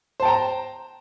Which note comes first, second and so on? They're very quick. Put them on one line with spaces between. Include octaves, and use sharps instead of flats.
C5 A5 G5 A#5